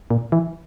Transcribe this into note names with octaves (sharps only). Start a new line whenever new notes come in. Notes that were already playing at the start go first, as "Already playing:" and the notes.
A#2
E3